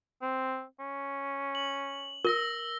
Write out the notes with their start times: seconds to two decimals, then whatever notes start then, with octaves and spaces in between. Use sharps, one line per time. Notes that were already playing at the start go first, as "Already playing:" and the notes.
0.22 C4
0.80 C#4
1.55 F#7
2.25 A#4 E6 A#6 G7